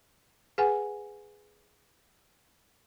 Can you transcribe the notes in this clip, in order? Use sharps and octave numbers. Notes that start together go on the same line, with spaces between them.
G#4 B4 F#5 G#5